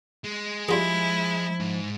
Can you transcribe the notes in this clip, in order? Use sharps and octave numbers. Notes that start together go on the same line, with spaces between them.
G#3
F3 G3 E4 F4 G#4
G#2